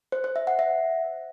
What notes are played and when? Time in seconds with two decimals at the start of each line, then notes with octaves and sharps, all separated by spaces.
0.12 C5
0.24 C5
0.36 E5
0.47 F#5
0.59 E5